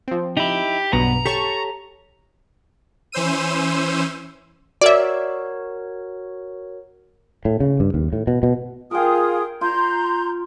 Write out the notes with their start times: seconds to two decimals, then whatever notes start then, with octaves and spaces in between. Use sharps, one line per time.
0.08 F3 C4
0.37 D#4 E4 G4
0.93 B1 G2 B2 B3 A#5
1.26 G4 A4 C#5 A5 C#6
3.12 E3 C#4 C5 E6 D#7
4.81 F#4 A#4 C#5 D5 E5
7.45 A2
7.60 C#3
7.80 G2
7.94 D#2
8.13 A2
8.27 B2
8.43 B2
8.91 F4 G#4 A#4 G5 D#6
9.61 F4 A#5 C6 G6